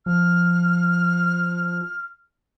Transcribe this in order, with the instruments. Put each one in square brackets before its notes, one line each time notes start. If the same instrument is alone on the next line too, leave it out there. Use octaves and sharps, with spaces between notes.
[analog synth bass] F3 [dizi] F6